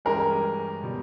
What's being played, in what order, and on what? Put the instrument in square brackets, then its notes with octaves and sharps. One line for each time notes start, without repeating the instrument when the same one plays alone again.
[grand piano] G2 E3 G#3 C#4 G4 [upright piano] A#4
[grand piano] B2 G3